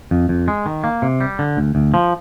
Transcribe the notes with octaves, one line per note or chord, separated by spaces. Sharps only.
F2
F2
G#3
D#3
A#3
C3
G3
D3
D2
D2
F3